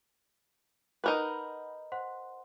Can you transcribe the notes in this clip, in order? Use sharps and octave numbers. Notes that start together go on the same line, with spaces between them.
D#4 A#4 B4 F#5 B5 G6
C5 F#5 C6